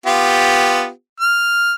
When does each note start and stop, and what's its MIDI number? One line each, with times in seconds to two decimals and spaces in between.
0.06 0.89 59
0.06 0.89 65
0.06 0.89 67
1.20 1.74 89